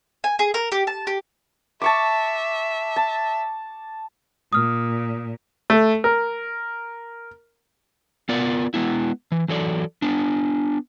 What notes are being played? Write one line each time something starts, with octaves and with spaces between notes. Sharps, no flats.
G#5
G#4
A#4
G4
A5
G4
E5 A5 C#6 D6
A5
A#2 D#6 F6
A3
A#4
B3 F4 A#4 D5
G#3 B3 E4
E3
E3 F#3 A4 D5
B3 D4